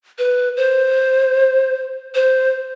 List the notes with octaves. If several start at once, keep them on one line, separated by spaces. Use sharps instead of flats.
B4
C5
C5